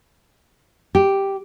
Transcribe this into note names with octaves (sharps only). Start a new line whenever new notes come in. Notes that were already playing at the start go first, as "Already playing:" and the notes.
G4